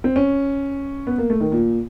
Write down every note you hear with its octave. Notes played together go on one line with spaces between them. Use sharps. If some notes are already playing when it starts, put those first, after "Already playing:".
C4
C#4
B3
A#3
A3
D#3
A#2